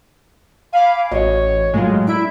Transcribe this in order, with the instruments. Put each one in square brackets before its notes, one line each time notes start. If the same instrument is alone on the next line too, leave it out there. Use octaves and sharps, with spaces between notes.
[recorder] F5 [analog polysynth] G#5 B5 D6
[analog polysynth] A1 [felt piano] F#4 D#5 [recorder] C#5
[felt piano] A2 F#3 [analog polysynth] G#3 F4
[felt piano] D4 [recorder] E4 [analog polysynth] E5 D7